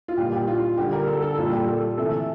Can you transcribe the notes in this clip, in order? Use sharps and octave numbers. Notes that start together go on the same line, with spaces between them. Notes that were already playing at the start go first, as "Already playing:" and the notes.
F4
A#2 G3 G4
G4
F4
D3 G3 G4
A#4
A4
A4
A#2 G3 F4
G4
A4
C3 E3 A3 A4